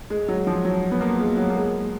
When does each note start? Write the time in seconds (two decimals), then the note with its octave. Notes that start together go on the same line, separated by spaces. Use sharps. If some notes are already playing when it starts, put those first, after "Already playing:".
0.10 G#3
0.28 F#3
0.47 F3
0.65 F#3
0.91 B3
1.01 A#3
1.20 G#3
1.37 F#3
1.50 A#3
1.55 G#3